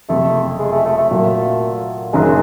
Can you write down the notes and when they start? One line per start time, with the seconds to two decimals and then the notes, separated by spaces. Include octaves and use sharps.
0.09 F#1 F2 C3 A3
0.59 G#3
0.72 A3
0.85 A3
0.98 A3
1.11 A#2 F#3 A#3
2.13 F#1 F#2 D#3 G#3